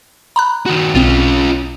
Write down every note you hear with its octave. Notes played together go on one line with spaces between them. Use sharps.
A#5 B5 F#6
D#3 F#4
B1 B2 C4 C#4 F4